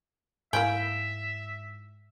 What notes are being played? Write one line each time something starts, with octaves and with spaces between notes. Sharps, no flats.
G#2 A#3 E4 E5 G5 G#5